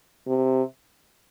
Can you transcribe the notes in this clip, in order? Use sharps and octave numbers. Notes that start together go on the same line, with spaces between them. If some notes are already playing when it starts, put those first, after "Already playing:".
C3